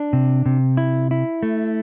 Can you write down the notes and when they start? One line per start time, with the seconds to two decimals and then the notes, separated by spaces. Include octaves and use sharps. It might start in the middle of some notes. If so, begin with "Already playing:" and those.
Already playing: D4
0.13 C3
0.46 C3
0.77 E4
1.11 E4
1.43 A3